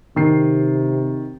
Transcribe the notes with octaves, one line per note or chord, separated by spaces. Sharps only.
C3 D#3 C7